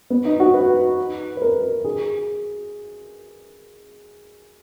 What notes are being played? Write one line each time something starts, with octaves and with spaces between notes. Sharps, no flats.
B3
D#4
F#4
B4
B4
A#4
G#4